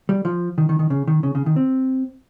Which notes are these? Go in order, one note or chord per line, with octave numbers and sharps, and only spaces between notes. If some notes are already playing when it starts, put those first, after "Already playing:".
G3
F3
D#3
D#3
D#3
C#3
D#3
C#3
C#3
D#3
C4